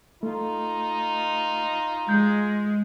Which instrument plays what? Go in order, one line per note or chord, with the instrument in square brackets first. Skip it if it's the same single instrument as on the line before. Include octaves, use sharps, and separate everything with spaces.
[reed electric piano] A3 [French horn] D#4 [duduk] F4
[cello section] G#3 [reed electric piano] G6